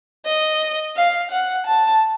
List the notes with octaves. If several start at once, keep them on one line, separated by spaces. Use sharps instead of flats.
D#5
F5
F#5
A5